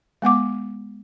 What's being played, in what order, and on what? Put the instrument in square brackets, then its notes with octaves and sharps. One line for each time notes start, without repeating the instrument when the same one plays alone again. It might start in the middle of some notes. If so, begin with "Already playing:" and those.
[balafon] G#3 B3 F#5 D6